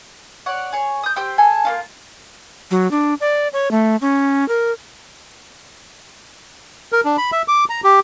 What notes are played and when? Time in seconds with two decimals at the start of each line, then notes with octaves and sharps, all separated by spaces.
0.46 C#5 D5 F#5
0.72 G#4 C#5
1.03 D#6 G6
1.16 G4 C5 G5 E6
1.38 G#4 A4 G#5
1.65 A#3 C#4 F4
2.71 F#3
2.91 D4
3.21 D5
3.53 C#5
3.71 A3
4.01 C#4
4.49 A#4
6.93 A#4
7.05 D4
7.17 B5
7.32 E5
7.48 D6
7.69 A#5
7.84 G4